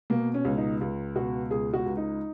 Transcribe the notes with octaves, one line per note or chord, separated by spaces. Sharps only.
B2 A#3
C#4
C#2
D#4
C#2
B2 F#4
C#2 G#4
F#4
C#2
D#4